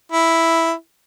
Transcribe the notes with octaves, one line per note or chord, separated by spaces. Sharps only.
E4